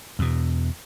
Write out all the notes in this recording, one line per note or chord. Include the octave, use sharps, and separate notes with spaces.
E2 B2